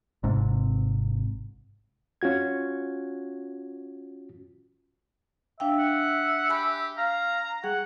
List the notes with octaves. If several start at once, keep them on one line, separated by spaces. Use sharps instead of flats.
G#1 G#2 C3
C#4 F4 F#4 G#6
D4 E5 F5 G5
F#5
G4 G#5 B5 F#6
F5 A#5
G3 G#4 F#5